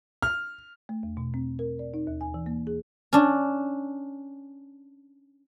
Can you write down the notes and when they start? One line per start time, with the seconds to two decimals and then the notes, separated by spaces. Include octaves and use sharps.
0.22 F6
0.89 A3
1.03 E2
1.17 B2
1.34 C4
1.59 A#4
1.79 D5
1.94 D#4
2.07 D#2
2.21 G#5
2.34 E3
2.46 A#3
2.67 G#4
3.13 C#4 D4